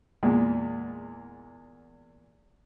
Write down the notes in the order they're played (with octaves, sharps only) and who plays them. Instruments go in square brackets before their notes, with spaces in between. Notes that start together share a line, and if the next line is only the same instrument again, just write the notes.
[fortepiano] E2 A#2 G#3